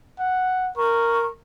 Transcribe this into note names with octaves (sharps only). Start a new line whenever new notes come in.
F#5
A#4 C#6